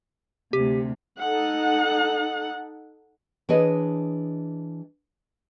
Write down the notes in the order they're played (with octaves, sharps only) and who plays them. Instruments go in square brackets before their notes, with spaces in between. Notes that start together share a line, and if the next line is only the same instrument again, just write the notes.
[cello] D2 C3 [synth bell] G4
[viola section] D#4 A4 F#5
[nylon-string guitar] E3 D4 G#4 C#5 D#5